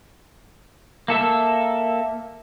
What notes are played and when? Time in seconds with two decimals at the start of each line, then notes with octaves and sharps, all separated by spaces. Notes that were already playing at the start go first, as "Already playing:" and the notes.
1.08 A#3 A4 E5